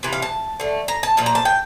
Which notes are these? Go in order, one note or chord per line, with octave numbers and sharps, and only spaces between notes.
C3 E3
F5
A5
D3 A3
A#5
A5
A#2 F3 A#3
A#5
A5
G5